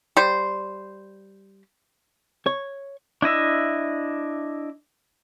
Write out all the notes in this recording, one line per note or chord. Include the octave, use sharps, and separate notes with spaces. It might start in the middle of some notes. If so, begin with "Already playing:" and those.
G3 C5
C#5
D4 E4 D#5 E5